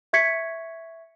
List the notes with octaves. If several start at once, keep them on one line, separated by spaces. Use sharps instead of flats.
E5 C#6 G#6 B6 C#7